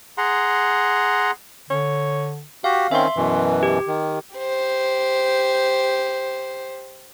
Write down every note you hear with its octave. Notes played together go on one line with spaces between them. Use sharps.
G#4 F#5 A#5 C6
D3 C#5
F#4 G4 F5
D#3 C4 C#4 E5 C6
F#2 B2 E3
G4
D#3
G4 C5